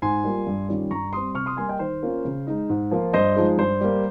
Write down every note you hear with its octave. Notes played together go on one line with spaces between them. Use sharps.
G#2 G#5 C6
G3 A#3 F4
G2
D#3 G3 C#4 F4
G2 A#5 C#6
G3 C4 C6 D#6
C3 C#6 F6
C6 D#6
G3 A#3 G#5 C6
D#5 G5
D#3 C5
A#3 C#4 F4
C#3
G#3 D#4
G#2
F3 A#3 F4
G2 C5 D#5
F3 G#3 D#4
G2 C5
G3 A#3